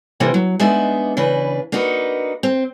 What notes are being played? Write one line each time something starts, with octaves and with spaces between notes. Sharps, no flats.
C3 E3 A3 A#3 C4 D4
F#3
G#3 B3 D4 D#4 E5
C#3 E3 D4 B4
A#3 D4 D#4 F#4 B4
C4